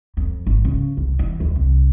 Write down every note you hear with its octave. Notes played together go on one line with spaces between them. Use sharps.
F2
G#1
C#3
C2
E3
D#2
C2